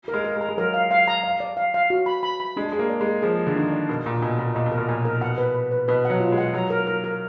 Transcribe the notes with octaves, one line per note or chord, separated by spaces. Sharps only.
A#4
G#3
A#4
G#3
A#5
G#3
F#3 A#4
F5
F5
A#5
F5
D5
F5
F5
F#4
B5
B5
B5
G#3 D4
G#3 G#4
A#3
D5
G#3
G#4
F3 G#4
G#4
D3
D#3 D4
D5
B2 A#4
A#2 G#5
B2 G#5
A#2 A#4
A#2 D#5
B2
A#4
A#2
A#2 G#5
A#4
B2 F#5
B4
B4
B4
B2 B4
F#3 F#5
F4
G#3
F#5
F#3 A#5
A#4
A#4
A#4